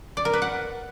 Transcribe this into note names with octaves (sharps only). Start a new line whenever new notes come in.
D5
A#4
B4
F#5